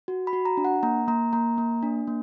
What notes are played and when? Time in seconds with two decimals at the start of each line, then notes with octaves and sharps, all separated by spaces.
0.08 F#4
0.27 B5
0.33 F#4
0.45 A#5
0.57 D4
0.65 F#5
0.83 A#3 A#5
1.08 A#3 A#5
1.33 A#3 A#5
1.58 A#3
1.83 D4
2.07 A#3